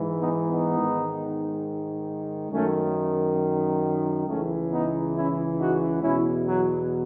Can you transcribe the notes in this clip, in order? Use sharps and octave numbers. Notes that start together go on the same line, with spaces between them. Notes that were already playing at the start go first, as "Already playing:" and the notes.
Already playing: G#2 E3
B3 D#4
B3 D#4
G#2 D#3
F#2 D#3 A3 C#4
C#2 C#3 E3 A3 C#4
B3 D#4
C#4 E4
D#4 F#4
E2 B2 C#4 E4
F#3